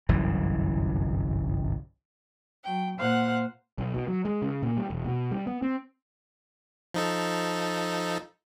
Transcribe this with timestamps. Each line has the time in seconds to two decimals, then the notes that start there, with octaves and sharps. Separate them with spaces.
0.09 G1 C2 F#2 E3
2.64 F#3 G5
2.99 A#2 C5 F5 F#5 F#6
3.78 B1
3.94 B2
4.08 F#3
4.25 G#3
4.42 C#3
4.63 A#2
4.77 G3
4.90 E1
5.05 B2
5.32 G3
5.47 B3
5.62 C4
6.94 F3 D#4 A4